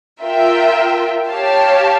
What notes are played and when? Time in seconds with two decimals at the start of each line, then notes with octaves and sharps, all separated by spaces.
0.21 F4 A#4 E5 G5
1.28 G4 C#5 F5 A5